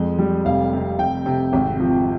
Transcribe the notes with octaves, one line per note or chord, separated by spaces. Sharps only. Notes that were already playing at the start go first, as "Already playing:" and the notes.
Already playing: F2 G#3
G3
F1 F5
C3
F1 G5
C3
G#1
F3